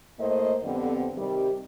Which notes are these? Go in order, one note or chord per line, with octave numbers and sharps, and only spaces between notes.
A2 A#3 C5 D#5
F2 D3 G3 B3 C4
C3 D#3 G3